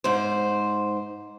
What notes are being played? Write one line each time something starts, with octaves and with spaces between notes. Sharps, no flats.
G#2 C5